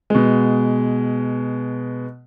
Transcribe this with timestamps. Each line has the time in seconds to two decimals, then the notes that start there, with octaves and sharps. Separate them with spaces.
0.10 B2 G#3